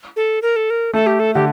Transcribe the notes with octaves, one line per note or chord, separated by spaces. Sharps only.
A4
A#4
A4
A#4
A3 A4
G4
A4
D3 G4